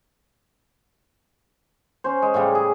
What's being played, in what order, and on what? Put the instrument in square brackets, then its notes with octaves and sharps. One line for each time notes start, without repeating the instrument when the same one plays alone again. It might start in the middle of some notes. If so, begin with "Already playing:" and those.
[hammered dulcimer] C#4 C5
G#3
A2 C#3 G3
G#4